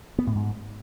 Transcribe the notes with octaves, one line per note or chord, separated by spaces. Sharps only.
B3
A2
G#2